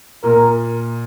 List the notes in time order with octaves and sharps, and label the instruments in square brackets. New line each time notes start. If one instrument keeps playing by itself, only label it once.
[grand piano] A#2 [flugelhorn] A#4